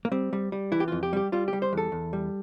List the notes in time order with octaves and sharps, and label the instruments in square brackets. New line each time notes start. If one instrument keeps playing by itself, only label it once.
[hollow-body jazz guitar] A#3
G3 C4
G3
G3
E3 E4
G4
F2 F4
G4
G3 G4
G3 F4
G4
G3
C5
E2 A4
E2
G3